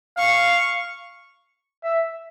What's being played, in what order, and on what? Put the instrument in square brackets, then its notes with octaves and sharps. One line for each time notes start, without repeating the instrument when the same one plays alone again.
[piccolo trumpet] F5 [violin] C#6
[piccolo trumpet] E5